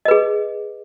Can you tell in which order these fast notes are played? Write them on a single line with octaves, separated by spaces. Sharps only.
D#5 B4 G#4